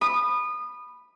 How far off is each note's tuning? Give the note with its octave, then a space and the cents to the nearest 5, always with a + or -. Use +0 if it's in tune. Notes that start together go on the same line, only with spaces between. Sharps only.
B5 +0 D#6 -25